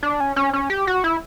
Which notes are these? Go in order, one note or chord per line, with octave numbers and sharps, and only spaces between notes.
D4
C#4
C#4
C#4
G4
F#4
E4